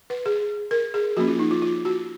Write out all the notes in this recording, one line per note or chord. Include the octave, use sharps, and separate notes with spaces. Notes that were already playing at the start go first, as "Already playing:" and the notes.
B4
G#4
A#4
G#4
F3 A#3 C#4 F#4
F4
D#4
F4
F4
F#4